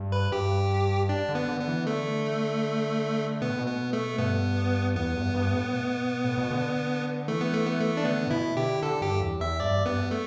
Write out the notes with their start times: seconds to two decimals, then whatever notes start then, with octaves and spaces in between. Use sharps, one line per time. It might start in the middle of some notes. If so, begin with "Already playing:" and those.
Already playing: G2
0.12 B4
0.32 G2 G4
1.09 D4
1.29 D3
1.35 B3
1.48 D3
1.60 B3
1.67 E3
1.86 D3 A3
3.41 B2 B3
3.50 A2
3.58 B2
3.67 B3
3.93 A3
4.18 G2 B3
4.96 E2 B3
5.15 G2
5.34 G2
5.54 A2
5.73 B2
6.24 A2
6.38 B2
6.50 D3
7.28 E3 A3
7.41 B3
7.54 A3
7.67 B3
7.80 A3
7.97 D4
8.05 D3 B3
8.27 A2
8.31 B2 E4
8.57 D3 G4
8.83 D3 A4
9.01 G2 G4
9.21 E2
9.40 E2 E5
9.60 G2 D5
9.86 G2 B3
10.11 A3